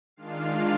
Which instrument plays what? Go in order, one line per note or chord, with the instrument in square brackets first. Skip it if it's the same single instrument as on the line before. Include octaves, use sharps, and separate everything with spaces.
[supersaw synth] D#3 G#3 D4 F4 F5